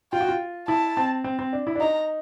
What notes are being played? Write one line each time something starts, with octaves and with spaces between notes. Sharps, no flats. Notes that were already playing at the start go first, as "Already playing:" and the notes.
F4 G5
F#4
F4
E4 A5
C4
C4
C4
D4
E4
D4
D#4 A#5